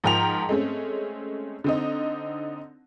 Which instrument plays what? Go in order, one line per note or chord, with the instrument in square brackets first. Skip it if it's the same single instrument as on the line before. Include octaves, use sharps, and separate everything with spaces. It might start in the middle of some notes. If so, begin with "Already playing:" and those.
[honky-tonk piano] G#2 F3 A#4 G5 A#5 F7
G#3 A3 C4 C#4
D3 C4 D#4